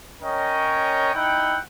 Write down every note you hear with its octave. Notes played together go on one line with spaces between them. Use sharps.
C#4 A#4 C#5 D#5 G5
D#4 E4 F#5 G5